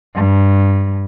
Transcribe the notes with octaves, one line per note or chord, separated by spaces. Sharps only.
G2